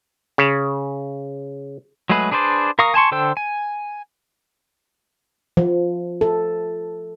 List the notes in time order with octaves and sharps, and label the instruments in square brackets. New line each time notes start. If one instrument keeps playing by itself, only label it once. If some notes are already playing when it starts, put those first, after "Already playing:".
[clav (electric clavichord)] C#3
[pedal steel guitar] F#3 G#3 A3 G#4 B4
D4 G#4 B4 C5 D5
A#4 F5 A#5 C#6 D#6
G#5 A5 C6 C#6
D3 A4 C5 G5 E6
G#5
[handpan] F3
A4